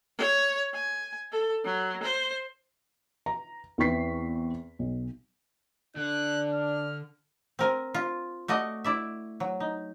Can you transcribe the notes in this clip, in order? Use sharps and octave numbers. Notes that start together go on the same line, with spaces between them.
C#5
G#5
A4
F#3
C5
A#5
E2 E3 C4 C#6 B6 C7
B1
D3 D4 F#6
F6
C4 A#4 G#5
F4
A3 F#4 D5 D#5
E4 D5 E5
F#3
D#4